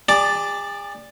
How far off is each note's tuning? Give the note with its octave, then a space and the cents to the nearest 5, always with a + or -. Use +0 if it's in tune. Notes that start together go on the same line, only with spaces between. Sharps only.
G#4 -45 D5 +0 A5 +0